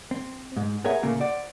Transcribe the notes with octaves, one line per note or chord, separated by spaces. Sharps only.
C4
G#2
G#4 A#4 B4 C#5 E5 F#5
A#2 C#3 A3 A#3
C5 D5 F#5